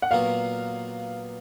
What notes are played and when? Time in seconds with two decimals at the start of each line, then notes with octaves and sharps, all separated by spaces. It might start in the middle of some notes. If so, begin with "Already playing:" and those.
0.02 F#5
0.11 A#2 F#3 B3 F#4 F5